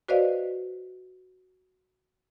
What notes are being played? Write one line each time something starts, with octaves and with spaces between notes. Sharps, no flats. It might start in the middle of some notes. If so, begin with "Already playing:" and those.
F#4 B4 C5 D5 D#5 F5